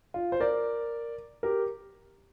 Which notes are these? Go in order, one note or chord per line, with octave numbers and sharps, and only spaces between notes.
F4
C5
A#4 D5
G4 A#4